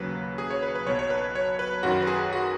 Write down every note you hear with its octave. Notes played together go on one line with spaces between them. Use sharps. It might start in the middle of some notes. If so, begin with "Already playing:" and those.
Already playing: D#2 C#3 F#3 B4
G#4
C#5
B4
B4
B1 B2 F#3 C#5
C#5
B4
C#5
B4
F#2 D#3 F#3 F#4
B4
G#4
F#4